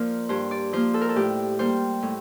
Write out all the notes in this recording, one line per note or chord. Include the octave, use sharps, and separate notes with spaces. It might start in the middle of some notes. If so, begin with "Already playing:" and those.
Already playing: F3 A#3 A#4 C5 D5
G2 C5
D5
F3 A#3 C5
A4
A#4
A4
A2 G4
G3 A#3 C5
A2